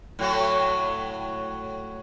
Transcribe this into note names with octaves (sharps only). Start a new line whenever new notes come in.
A2 F#3 F#4